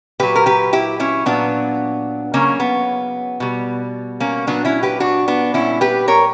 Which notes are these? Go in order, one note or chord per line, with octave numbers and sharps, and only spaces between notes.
A#2 F#3 G4 B4
A#4
G4 B4
E4 G4
C#4 E4
A#2 F#3 B3 D4
C#3 F#3 A#3 C#4
B3
B2 G3
A#3 C#4
A#2 F#3 B3 D4
C#4 E4
G4 B4
D4 F#4
B3 D4
A#2 G3 C#4 E4
G4 B4
A#4 C#5